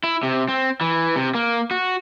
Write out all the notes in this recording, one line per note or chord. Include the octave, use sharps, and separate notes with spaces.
E4
C3
C4
E3
C3
A#3
F#4